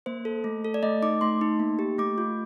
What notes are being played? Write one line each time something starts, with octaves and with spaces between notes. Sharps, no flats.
A#3 C5
A4
A3
A4
D5
A3 D#5
D#4 D6
A3 C6
D#4
A#3
G4
A3 D6
F4